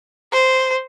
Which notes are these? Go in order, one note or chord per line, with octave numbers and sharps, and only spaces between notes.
C5